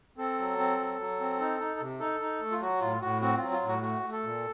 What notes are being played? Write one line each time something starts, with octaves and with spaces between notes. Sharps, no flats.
C4 A4
F#3
C4
F#3
F#3
C4
D#4
D#4
C3
D#4 A4
D#4
A3
F4
F#3 F#4
A2 F4
A2 F#4
C4 F#4
F#3 F4
F4
A2
F#4
A3 F#4
A3
A4
A#2